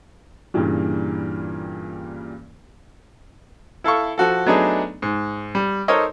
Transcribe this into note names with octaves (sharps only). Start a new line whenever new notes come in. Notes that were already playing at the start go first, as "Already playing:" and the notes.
G2 A#2 C#3 E3 G3
E4 A4 F5 C#6
F3 F#4 A4
F#3 A3 B3 D4 D#4 G#4
G#2
G3
D#4 A4 A#4 C5 C#5 D#5